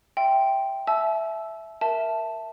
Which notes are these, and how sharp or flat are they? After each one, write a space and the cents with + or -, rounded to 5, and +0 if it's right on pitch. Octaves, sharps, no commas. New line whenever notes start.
E5 +0 G5 +0 C6 +0
E5 +0 A5 -40 E6 +0
A#4 +0 E5 +0 A5 +0